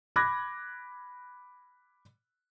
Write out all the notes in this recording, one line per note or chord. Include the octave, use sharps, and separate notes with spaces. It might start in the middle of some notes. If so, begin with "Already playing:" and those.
B5 D6 F#6 G#6 A#6